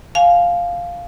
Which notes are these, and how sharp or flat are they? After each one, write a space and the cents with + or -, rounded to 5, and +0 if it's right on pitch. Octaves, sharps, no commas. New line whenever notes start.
F5 +0 G#5 +30